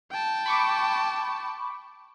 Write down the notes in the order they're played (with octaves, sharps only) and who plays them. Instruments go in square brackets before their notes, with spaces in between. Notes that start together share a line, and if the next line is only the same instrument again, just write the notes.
[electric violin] G5 A5
[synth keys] B5 C#6 D6